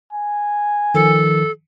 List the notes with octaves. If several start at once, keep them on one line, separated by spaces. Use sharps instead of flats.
G#5
D#3 F3 A4